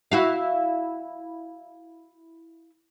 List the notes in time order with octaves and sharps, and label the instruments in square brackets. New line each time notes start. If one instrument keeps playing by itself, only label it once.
[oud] E4 F#4 F5